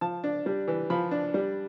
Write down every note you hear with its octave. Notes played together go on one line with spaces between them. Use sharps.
F3 A5
D4
G3
E3
F3 B5
D4
G3